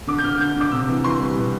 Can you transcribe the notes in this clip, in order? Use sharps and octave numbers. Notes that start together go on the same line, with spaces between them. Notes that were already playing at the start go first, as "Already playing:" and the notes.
D3 D6
G6
D3 F6
D3 G6
D3 D6
C3 E6
E3
E3 C6
G3
B2